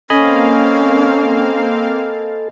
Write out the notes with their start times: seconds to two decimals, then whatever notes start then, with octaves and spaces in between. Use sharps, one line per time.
0.10 A#3 C4 C#4 A4 D#5 F5 G#5 B5